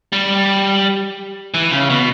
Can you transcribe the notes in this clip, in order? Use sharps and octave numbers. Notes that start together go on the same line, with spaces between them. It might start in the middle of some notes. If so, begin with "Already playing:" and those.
G3
E3
C#3
B2